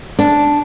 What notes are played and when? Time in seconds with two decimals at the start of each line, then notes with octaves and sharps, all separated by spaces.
0.19 D4